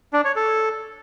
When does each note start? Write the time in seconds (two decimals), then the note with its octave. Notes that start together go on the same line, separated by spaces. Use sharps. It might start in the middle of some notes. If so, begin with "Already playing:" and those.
0.13 D4
0.25 C#5
0.36 A4